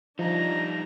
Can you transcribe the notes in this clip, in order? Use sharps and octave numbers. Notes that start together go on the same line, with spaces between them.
F3 G3 D4 D#4 A#5